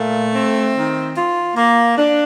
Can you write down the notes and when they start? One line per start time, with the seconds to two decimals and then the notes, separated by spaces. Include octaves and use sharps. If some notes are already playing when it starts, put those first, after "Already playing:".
Already playing: A#2 A3
0.34 C4
0.75 D#3
1.16 F4
1.56 A#3
1.97 D4